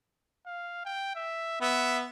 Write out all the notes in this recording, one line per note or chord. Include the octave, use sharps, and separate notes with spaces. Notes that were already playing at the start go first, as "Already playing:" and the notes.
F5
G5
E5
B3 E5